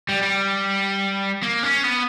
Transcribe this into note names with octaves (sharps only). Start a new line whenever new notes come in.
G3
G3
A#3
C#4
B3